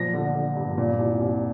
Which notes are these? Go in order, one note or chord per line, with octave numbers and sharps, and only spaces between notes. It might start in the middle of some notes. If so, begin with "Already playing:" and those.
Already playing: A#2 F3 A#6
D3
D3
G2
A#2
C2
C2